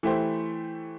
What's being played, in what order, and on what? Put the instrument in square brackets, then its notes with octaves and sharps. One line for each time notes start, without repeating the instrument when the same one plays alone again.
[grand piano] E3 A3 E4 G4 C5